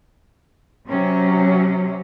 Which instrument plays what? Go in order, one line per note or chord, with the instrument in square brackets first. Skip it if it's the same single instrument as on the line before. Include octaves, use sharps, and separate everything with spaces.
[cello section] C3 F#3 C#4